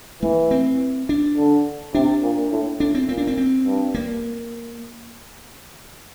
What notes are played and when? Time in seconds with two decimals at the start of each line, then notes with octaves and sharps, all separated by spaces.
0.22 E3 A3
0.51 C4
1.09 D4
1.37 D3
1.94 C3 D4
2.22 A#2
2.51 A2
2.80 A2 D4
2.94 C4
3.09 A#2 C4
3.18 D4
3.27 C4
3.38 C4
3.66 G2
3.95 A#3